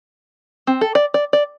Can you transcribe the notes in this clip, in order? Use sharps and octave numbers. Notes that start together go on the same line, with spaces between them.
C4
A4
D5
D5
D5